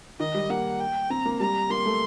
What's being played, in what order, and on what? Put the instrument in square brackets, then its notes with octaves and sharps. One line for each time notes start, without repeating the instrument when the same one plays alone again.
[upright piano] D#3 [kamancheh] D#5
[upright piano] G3
[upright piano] A#3 [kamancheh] F#5
[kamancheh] G5
[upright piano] C4 [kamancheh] A#5
[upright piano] A#3
[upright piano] G3 [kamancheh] A#5
[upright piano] A#3 [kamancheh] C6
[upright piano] A3